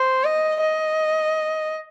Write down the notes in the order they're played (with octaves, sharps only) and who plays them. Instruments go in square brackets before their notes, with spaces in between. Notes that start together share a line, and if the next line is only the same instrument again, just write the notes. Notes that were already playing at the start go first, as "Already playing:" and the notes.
Already playing: [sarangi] C5
D#5
D#5